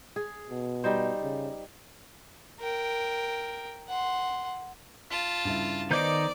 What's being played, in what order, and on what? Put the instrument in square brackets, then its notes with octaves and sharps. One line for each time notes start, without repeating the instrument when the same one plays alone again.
[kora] G#4
[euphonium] B2
[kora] G3 D#4 C5
[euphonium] C#3
[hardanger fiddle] A#4 G5
F#5 C6
[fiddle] F4 A5 [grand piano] B6
[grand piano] G2 C#3 E4
[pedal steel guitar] D#3 D#4 G6 [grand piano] B3 C5 D#5 [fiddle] D5 D6